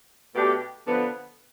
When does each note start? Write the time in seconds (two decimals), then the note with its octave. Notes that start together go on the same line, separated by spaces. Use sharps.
0.35 B2 A3 D4 G4
0.87 D3 F3 B3